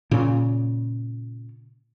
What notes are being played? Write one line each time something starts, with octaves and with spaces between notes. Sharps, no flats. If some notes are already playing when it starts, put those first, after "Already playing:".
A#2 C#3